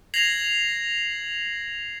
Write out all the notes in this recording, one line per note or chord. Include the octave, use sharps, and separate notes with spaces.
G#6 A#6 C7 F7 F#7